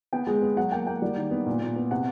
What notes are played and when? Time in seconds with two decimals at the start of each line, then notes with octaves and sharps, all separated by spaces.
0.13 B3 G5
0.27 G#3
0.42 B3
0.57 F#3 F#5
0.72 A#3 G5
0.87 A#3 G5
1.02 G3
1.17 D#3
1.31 B3
1.47 A#2
1.61 A#2
1.76 B3
1.91 C3 F#5